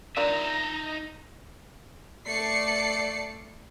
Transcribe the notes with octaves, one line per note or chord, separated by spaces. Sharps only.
D4 D#4 F4 A#4 E5 A#5
A3 D5 C7 C#7